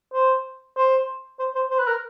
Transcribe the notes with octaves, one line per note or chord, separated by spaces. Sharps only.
C5
C5
C5
C5
C5
B4
A#4